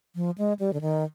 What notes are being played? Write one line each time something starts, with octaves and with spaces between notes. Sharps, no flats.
F3
G#3
G3
D3
D#3